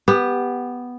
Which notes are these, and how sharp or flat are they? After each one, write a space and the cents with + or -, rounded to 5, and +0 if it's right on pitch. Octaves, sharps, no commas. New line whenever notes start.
B3 +0 G4 +15